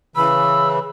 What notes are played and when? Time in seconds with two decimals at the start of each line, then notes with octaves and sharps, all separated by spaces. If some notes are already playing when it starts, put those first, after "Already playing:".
0.16 C#3 E3 B5 E6